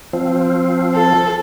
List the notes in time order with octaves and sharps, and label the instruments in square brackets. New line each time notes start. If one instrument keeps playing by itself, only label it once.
[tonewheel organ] F3 C4
[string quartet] A4